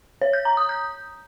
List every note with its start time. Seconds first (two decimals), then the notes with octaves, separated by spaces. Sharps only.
0.22 C#5
0.33 G6
0.45 A#5
0.57 D#6
0.69 G6